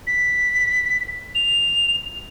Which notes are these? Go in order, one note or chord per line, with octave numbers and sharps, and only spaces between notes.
B6
F7